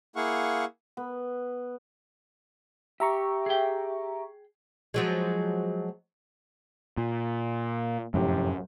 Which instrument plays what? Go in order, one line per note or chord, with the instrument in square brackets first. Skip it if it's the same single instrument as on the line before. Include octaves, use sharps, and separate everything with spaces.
[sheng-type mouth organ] A#3 E4 G#4 F5 F#5 C#6
[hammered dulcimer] B3
[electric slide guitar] G4 [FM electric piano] E5 A#5 C#6
[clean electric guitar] G#4 G5
[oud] F3 F#3 G#3
[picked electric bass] A#2
[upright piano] F1 A2 G4 [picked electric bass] F#2